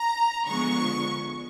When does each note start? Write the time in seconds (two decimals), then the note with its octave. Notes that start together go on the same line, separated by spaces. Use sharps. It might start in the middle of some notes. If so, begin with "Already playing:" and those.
Already playing: A#5
0.48 D3 F3 G#3 B3 C#6